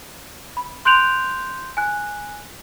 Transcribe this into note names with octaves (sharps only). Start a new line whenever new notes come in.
B5
C6 F#6 G6 D7 F7 F#7
G#5 F#6